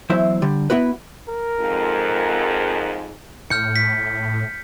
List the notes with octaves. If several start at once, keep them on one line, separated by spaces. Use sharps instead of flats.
E2 F#3 E4 C5 E5
D3 G3
B3 E4 F#4 B4
A#4
F2 G#2
A2 F6 G6 C#7
B6